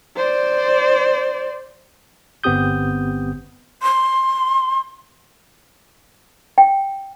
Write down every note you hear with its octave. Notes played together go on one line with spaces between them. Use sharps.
C5 D5
G1 B3 C4 G4 D#6 G6
C6
G5